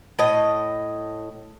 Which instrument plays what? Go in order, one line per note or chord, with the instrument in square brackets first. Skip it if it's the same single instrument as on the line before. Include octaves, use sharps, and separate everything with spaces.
[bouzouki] A2 D#5